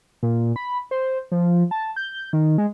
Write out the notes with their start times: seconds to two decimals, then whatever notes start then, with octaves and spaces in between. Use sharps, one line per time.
0.23 A#2
0.56 B5
0.91 C5
1.32 F3
1.71 A5
1.96 G6
2.33 D#3
2.58 G#3